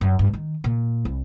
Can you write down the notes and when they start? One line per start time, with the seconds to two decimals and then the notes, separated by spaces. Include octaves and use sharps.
0.01 F#2
0.19 G2
0.33 D#3
0.64 A#2
1.05 C2